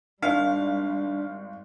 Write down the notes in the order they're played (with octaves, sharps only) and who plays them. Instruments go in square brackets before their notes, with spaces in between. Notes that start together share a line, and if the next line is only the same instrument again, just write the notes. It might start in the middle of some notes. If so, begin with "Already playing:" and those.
[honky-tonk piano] G#1 [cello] G3 [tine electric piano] D4 [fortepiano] F5